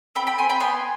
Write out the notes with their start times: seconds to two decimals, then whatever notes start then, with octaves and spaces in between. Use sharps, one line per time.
0.15 C4 G5 B5
0.27 G5 B5
0.38 C4 G#5 C6
0.49 G5 B5
0.60 B3 G#5 C6